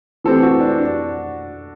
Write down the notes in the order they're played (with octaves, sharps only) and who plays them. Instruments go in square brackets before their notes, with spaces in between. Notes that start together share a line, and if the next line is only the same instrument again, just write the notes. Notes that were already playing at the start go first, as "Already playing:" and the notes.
[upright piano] E3 A3 C4 G4 [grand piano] A4
[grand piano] F#4
D4
D4